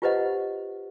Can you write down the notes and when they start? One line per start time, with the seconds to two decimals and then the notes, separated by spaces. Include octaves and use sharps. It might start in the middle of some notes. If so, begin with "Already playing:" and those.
0.02 F4 G4 B4 C5 D#5 F#5